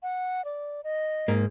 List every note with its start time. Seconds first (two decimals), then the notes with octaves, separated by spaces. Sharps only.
0.03 F#5
0.45 D5
0.84 D#5
1.28 G#2 A#3